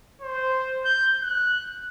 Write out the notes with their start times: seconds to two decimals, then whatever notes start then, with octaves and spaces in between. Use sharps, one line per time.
0.21 C5
0.85 G6
1.21 F#6